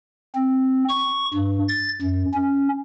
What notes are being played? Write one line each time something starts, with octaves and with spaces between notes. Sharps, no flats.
C4
C#6
G2
A6
F#2
C#4